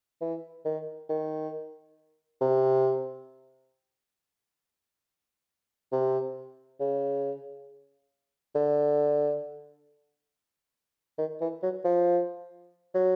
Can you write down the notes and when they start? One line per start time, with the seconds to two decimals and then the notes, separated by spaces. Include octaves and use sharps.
0.21 E3
0.65 D#3
1.09 D#3
2.41 C3
5.92 C3
6.80 C#3
8.55 D3
11.18 D#3
11.41 E3
11.63 F#3
11.85 F3
12.94 F#3